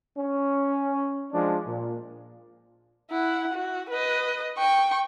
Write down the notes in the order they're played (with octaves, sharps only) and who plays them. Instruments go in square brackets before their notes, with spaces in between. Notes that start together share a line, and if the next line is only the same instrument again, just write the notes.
[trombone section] C#4
F3 G#3 D4
A#2
[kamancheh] E4 F#5
F#4
B4 D#5
G5 C#6